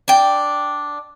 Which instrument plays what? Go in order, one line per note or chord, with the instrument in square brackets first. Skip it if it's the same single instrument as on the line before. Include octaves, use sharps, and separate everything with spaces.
[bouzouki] D4 G5